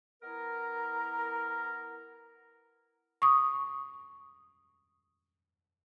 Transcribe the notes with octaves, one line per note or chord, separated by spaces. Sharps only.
B3 E4 A#4
C#6 D#6